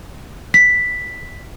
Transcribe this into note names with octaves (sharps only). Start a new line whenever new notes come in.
B6